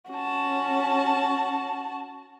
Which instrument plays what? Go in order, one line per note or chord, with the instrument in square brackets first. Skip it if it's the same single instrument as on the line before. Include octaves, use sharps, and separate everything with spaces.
[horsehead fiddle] C#4 [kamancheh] F#4 A5